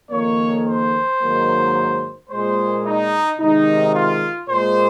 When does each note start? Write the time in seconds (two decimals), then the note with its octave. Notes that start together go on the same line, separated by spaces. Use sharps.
0.10 F2 D#3 A#3 C#5
0.66 C5
1.20 G#2 D#3 F#3 A#3
2.29 A#2 G#3 C5
2.85 D#4
3.38 C3 D#3 G#3 D#4
3.94 F4
4.48 A#2 G#3 C5